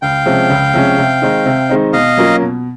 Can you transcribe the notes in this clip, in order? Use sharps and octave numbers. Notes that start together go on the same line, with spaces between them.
C#2 F5 G5
C3 F3 G#3 C#4
C#2
C3 F3 G#3 C#4
C3
D#3 G#3 C4 D#4
C3
D#3 G#3 C4 D#4
B2 D#5 F5
F#3 A#3 C#4 F4
B2